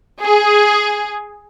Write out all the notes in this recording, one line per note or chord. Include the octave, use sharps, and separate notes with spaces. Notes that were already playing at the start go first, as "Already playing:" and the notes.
G#4